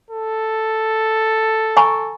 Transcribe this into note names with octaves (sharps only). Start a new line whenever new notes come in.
A4
G#5 A#5 C#6